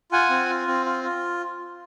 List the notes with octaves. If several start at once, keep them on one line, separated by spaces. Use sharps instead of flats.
F4 F#5 G#5
C4
F4
C4
F4
F4